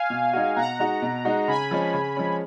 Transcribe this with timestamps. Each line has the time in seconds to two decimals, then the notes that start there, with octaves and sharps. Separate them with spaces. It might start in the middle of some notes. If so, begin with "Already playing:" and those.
Already playing: F5 G#5
0.10 B2
0.33 G#3 D#4 F#4
0.56 B2 F#5 A#5
0.79 G#3 D#4 F#4
1.02 B2
1.25 G#3 D#4 F#4
1.48 C#3 G#5 B5
1.71 F3 G#3 C#4
1.94 C#3
2.17 F3 G#3 C#4